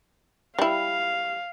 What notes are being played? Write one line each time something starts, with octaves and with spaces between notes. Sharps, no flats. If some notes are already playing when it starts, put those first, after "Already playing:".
G3 E4 F5